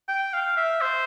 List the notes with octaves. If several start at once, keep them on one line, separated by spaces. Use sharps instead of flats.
G5
F5
E5
C5